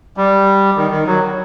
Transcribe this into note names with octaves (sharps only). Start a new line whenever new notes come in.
G3
D#3
D#3
F#3